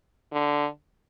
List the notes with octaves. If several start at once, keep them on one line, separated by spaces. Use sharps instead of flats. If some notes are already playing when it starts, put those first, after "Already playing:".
D3